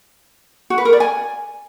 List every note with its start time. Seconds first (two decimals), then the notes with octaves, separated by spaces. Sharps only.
0.70 F#4
0.78 B4
0.85 A#4
0.93 D5
1.00 G#5